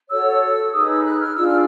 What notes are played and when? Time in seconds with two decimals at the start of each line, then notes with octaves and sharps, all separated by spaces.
0.09 F#4 A4 C#5 E6
0.72 D#4 G#4 B4 D#6
0.87 E6
1.04 F#6
1.19 F6
1.35 D4 F4 G#4 E6
1.47 F6